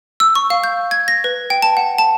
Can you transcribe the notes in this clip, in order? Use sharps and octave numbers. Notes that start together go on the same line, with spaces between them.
E6
C#6
F5
G6
G#6
A#6
B4
G5
A5
F#5
A5